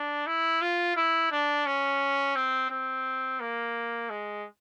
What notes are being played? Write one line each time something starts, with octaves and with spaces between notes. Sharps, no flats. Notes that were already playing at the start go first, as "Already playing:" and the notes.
Already playing: D4
E4
F4
E4
D4
C#4
C4
C4
A#3
G#3